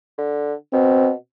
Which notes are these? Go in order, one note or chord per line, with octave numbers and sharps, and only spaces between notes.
D3
B2 C4